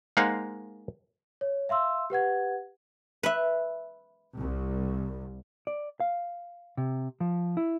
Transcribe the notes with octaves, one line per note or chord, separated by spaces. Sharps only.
G#3 A#3 D#4 C5 F5 F#5
C#5
E5 F5 C6 E6
G4 B4 F#5 G#6
B4 E5
C2
D5
F5
C3
F3
E4